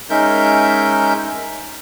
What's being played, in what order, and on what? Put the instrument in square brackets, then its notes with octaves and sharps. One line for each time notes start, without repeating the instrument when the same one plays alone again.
[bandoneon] G#3 C#4 D#4 A#4 E5 G6